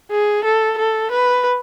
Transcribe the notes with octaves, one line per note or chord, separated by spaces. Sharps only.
G#4
A4
A4
B4